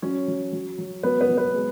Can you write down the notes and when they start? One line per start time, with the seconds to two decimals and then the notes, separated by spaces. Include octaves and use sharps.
0.02 F#3 C#4 C#5
0.28 F#3
0.53 F#3
0.78 F#3
1.03 F#3 B3 B4
1.21 B3 B4
1.29 F#3
1.37 B3 B4
1.54 G#3